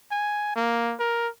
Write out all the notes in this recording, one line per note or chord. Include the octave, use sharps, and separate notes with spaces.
G#5
A#3
A#4